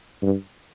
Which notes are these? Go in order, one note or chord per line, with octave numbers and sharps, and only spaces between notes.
G2